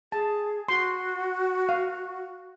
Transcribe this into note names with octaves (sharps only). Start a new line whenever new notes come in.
G#4 A5
F#4 C6
F5